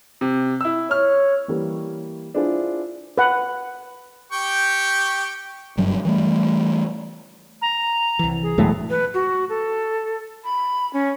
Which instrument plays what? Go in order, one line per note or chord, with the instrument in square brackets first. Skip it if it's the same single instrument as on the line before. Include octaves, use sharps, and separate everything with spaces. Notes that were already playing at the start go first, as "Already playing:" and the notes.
[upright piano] C3
E4 E6
[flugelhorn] C#5 [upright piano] F6
[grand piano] E3 G3 A#3
D4 E4 F4 G#4 C5
[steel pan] B4 F#5
[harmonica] G4 G5 C#6
[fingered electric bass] F#1 G2 F#3 G3
E3 G3 A3
[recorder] A#5
[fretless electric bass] C2 E3
[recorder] G#4
[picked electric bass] E1 E2 A2 [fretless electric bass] F#3 G#3 A3
[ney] B4
F#4
A4
B5
C#4